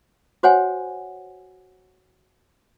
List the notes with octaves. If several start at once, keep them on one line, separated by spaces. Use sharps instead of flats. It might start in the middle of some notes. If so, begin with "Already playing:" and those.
F#4 C5 C#5 F#5 G#5